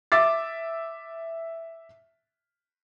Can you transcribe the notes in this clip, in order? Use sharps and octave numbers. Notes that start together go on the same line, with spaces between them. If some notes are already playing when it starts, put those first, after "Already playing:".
E5 D6 A6